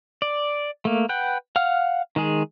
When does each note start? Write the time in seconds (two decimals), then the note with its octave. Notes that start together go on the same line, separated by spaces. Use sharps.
0.22 D5
0.85 A3 A#3
1.09 B4 F#5 G5
1.56 F5 F#5 F6
2.16 D#3 G#3 G#4